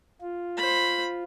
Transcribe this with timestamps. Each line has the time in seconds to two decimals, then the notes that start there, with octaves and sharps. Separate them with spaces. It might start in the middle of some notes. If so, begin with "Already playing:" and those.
0.21 F4
0.57 C5 B5